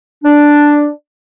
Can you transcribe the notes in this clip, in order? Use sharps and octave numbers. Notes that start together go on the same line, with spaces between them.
D4